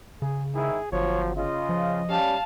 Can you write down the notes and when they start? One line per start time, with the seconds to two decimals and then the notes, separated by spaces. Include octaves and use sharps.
0.22 C#3 G#4
0.55 G#2 D#3 E4 G#4
0.92 G1 F3 F#3 C#5
1.36 C#3 F4 D#5
1.69 F3
2.09 G3 C#4 F5 A5